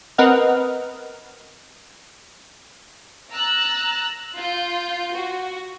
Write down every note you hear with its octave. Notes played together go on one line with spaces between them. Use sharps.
C4 A#4 B4 D#5 F#5 F6
A#5 E6 F#6 A6
F4 G6
F#4